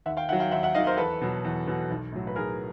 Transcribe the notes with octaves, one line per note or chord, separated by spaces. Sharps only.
D#2 E5 F#5
F5 G5
D#3 F#3 E5 F#5
F5 G5
D#2 E5 F#5
E5 F#5
D#3 F#3 D#5 F5
A#4 C5
E2 A4 B4
B2 F#3
E2
B2 F#3
B1
A2 F#3
B4
B1 G#4 A#4